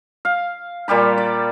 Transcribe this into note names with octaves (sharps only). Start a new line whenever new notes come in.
F5
A#2 G3 G4 B5
D5